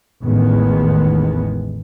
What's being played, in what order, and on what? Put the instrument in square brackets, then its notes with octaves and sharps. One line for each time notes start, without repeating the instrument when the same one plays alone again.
[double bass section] A1 E2 D#3 G#3 B3